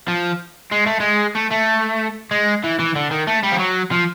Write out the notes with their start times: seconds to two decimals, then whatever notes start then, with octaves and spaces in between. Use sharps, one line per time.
0.08 F3
0.72 G#3
0.86 A3
1.00 G#3
1.35 A3
1.51 A3
2.31 G#3
2.64 E3
2.79 E3
2.96 D3
3.11 D#3
3.27 A3
3.43 G3
3.52 F3
3.59 F#3
3.92 F3